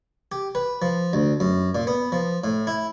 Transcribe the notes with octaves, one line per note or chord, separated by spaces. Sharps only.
G4
B4
F3
D2
F#2
A#2
B3
F3
A2
E4